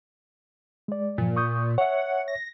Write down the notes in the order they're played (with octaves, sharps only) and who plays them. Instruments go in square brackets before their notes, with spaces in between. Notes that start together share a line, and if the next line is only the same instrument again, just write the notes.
[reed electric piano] G#3 D5
[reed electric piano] G2 F3 [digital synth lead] A#2
[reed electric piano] C#6 D#6 G6
[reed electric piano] C#5 E5 [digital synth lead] F#5
[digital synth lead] A#6